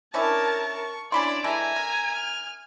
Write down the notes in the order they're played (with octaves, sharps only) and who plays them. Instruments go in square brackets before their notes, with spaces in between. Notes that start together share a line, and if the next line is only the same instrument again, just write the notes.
[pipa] C#4 D4 E4 [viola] A#4 A5 [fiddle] C#6
[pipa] C#4 B5 C6 [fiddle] D4 E4 [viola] D5
[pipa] E3 G#3 A4 [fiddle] E5 A#5 [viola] G#5
[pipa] A#4
[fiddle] F6